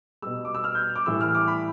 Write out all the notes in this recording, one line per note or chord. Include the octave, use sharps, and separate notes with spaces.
B2 G3 E6
D6
E6
F6
G6
D6
A2 E3 G3 E6
F6
D6
B5